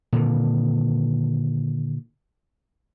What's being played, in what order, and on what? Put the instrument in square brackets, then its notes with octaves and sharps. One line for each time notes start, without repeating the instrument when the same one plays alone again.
[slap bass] A#2 D3 D#3